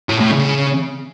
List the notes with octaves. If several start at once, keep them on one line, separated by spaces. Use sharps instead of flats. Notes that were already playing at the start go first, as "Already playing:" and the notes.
A2
A2
C#3